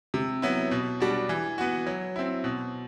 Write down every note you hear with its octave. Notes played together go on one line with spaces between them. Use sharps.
C3
F#3 B3 E4
B2
G3 D4 F#4
E3
B3 F#4
F#3
C4 E4
B2